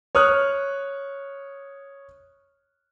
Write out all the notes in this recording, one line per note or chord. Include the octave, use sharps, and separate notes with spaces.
C#5 D#6 F6 F#6